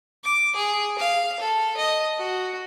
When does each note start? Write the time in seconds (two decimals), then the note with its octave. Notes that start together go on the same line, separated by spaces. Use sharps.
0.24 D6
0.55 G#4
0.98 F5
1.40 A4
1.77 D#5
2.18 F#4